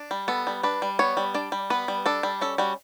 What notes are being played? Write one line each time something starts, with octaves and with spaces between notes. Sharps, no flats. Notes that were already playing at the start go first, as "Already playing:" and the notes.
Already playing: D4
G3
B3 A4
G3
D4 B4
G3
B3 C#5
G3
D4 D5
G3
B3 B4
G3
D4 A4
G3
C#4 A4
G3 F#4